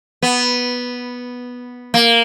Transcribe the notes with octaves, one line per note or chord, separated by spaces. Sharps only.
B3
A#3